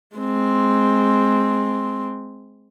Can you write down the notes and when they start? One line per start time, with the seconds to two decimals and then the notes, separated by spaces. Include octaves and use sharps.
0.17 G#3 C4